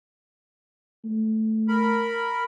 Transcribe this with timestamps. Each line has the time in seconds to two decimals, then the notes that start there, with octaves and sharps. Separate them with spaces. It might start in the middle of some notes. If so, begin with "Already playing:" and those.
1.05 A3
1.69 A#4 B5